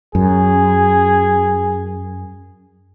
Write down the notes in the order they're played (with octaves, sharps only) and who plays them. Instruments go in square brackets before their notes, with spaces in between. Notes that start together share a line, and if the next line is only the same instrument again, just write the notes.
[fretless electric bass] F#2 [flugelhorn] G#4